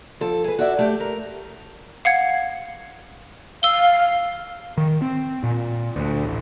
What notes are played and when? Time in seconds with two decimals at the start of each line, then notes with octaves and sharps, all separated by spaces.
0.21 F3 A4
0.44 G#4 B4
0.59 F#4 D5 E5
0.79 A3 G4
1.00 A#4
2.05 F5 F#5 G#6
3.63 F5 E6 G7
4.77 D#3
5.01 C4
5.43 A#2
5.96 D2
6.24 A1